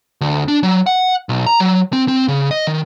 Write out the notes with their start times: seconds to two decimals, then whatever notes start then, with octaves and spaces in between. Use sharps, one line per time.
0.21 D2
0.48 D4
0.63 F#3
0.86 F#5
1.29 B1
1.46 A#5
1.60 F#3
1.93 C4
2.08 C4
2.28 C#3
2.51 D#5
2.67 D#3